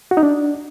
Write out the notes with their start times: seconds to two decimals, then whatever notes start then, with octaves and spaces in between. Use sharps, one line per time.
0.11 F#4
0.17 D#4
0.23 D4